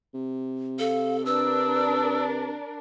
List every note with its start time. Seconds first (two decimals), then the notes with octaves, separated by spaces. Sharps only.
0.15 C3
0.79 A4 F5
1.26 D4 A#4 B4 E6